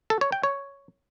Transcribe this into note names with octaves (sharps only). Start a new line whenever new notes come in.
A4
C#5
G5
C#5